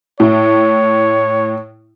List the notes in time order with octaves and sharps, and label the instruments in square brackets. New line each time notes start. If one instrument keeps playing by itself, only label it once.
[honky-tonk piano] A2 E4 [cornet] C#5